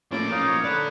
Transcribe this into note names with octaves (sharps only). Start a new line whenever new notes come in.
A2 F3 A#3 C#4 D5
C#4 D#4 F5
C#5
A4 B4 D5